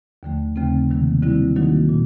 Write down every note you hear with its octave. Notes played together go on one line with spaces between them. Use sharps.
D#2 D3 F3 A3
D#2 C#3 F3 A3 C4
C3 D#3 F#3 A#3
D3 G3 C4 E4
D#3 F#3 A#3 D#4 F#4
A#2